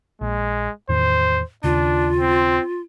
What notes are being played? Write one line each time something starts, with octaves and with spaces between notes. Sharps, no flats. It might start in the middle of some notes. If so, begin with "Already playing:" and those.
A#1 G#3
E2 A2 D#3 C5
D#2 C#3 D4 F4
C4